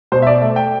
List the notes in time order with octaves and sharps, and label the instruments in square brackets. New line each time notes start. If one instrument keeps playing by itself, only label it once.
[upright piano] B2 C5
E5
D5
A3 E5
G5